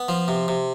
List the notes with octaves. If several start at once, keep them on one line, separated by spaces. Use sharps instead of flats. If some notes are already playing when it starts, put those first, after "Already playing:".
Already playing: B3
F3
C3
C3